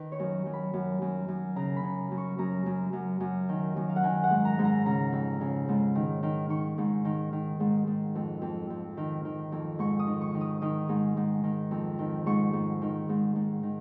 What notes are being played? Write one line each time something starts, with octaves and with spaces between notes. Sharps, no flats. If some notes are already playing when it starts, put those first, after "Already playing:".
Already playing: D#3 B4
C#5
F#2
F#2
B5
F#2
F#2
F#2
C#3 A#5
B5
C#3
F#2
C#6
F#2 A#5
F#2
F#2
F#2
D#3
F#2
F5
F#5
D#3 G#5
F#5
G#2
A#5
G#2
A#5
C#3 A#5
F2
C#3
G#2
D#3
D#3
D#3 C#6
G#2
D#3
D#3
G#2
G#2
F2
F2
F2
D#3
D#3
F2
G#2 C#6
D#6
D#3
C#6
D#3
D#6
D#3 D#6
G#2
G#2
D#3
F2
D#3
G#2 C#6
G#2
D#3
G#2
G#2
D#3